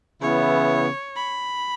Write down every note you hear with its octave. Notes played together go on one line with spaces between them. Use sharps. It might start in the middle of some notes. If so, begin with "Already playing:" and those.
C#3 E3 B3 E4 C#5
B5